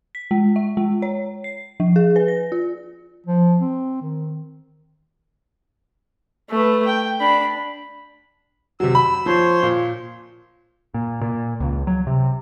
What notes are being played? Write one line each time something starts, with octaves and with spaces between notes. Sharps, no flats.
B6
G#3
E5
G#3
C#5
C7
F3
G#4
B4
A#6
F4
F3
C4
D#3
A3 B4
G5
D4 B5
C3 F#3 E6
B5
F3 C5 C#5 C6
A#2
A#2
A#2
C#2
F#3
C3